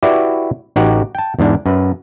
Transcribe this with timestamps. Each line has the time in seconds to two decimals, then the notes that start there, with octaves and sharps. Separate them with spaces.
0.03 E4 F#4 G4 B4 D5 E5
0.76 A1 D#4 F#4 G4 F#5
1.15 G5 A5
1.39 E2 G#2 D4
1.66 F#2 B4